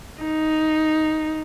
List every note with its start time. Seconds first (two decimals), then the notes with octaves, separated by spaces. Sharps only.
0.22 D#4